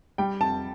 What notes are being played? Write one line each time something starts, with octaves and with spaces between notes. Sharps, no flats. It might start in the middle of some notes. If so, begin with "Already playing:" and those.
G3 G5
F2 A5